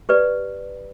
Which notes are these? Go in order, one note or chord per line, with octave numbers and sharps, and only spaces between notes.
G4 B4 D5